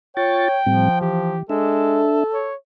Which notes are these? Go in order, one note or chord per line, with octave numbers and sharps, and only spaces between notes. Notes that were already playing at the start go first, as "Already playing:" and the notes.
F4 C#5 G5 C#6 A6
A2 F3 G3 C4
E3 G4
G#3 D4 A4 E5
C#5